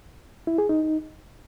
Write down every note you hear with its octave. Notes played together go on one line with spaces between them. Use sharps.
E4
G#4
D#4